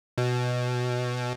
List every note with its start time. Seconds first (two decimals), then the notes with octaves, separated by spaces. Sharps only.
0.18 B2